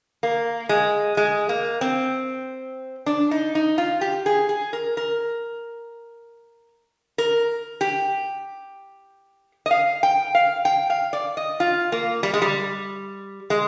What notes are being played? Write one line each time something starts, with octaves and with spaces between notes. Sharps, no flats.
A#3
G#3
G#3
A#3
C4
D4
D#4
D#4
F4
G4
G#4
G#4
A#4
A#4
A#4
G4
D#5
F5
G5
F5
G5
F5
D5
D#5
F4
A#3
G3
G#3
G3
G#3